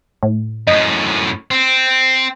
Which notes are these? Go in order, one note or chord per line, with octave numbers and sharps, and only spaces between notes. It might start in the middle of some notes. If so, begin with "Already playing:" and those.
A2
F#2 A2 D#5
C4